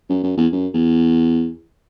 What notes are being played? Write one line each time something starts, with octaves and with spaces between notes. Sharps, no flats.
F#2
F#2
E2
F#2
E2